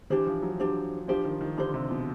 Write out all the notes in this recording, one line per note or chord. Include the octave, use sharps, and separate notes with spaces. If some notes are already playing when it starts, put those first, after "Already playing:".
E3 D4 G4 C5
F3
F#3
D4 G4 C5
F3 D4 G4 C5
D#3
D#3
D3 D4 G4 C5
C3
B2